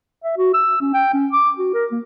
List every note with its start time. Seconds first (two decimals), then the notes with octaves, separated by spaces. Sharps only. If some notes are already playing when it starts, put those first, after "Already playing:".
0.24 E5
0.37 F#4
0.54 E6
0.81 C#4
0.94 G5
1.14 C#4
1.32 D6
1.58 F#4
1.74 A#4
1.92 A#3